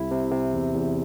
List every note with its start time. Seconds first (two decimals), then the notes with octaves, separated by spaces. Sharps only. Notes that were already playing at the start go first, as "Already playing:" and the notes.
Already playing: C2 C3 E4
0.11 C3
0.32 C3
0.54 E2
0.74 E2